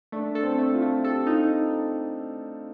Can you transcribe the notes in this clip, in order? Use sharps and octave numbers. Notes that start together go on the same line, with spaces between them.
A3 D4
A4
C4
A3
F4
A3
G4 A4
D#4 F4